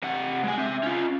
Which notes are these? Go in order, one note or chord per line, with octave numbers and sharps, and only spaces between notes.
C3 F#5
G#3 G#5
C4 E5
C#4 F4